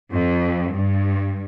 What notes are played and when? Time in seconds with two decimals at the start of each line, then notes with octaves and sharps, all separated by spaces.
0.12 F2
0.73 G2